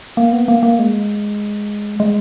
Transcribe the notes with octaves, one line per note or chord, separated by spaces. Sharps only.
A#3
B3
A#3
A#3
G#3
G#3